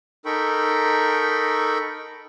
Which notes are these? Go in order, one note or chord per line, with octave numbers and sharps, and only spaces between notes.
D#4 A4 A#4 G5 B5 C#6